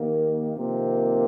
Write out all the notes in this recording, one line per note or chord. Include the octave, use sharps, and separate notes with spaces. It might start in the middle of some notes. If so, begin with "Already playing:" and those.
Already playing: D#2 D#3 A#3
F2 C3 D#3 A#3